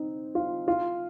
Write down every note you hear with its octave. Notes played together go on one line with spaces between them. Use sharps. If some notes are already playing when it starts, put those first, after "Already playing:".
Already playing: C4 D#4
F4
F4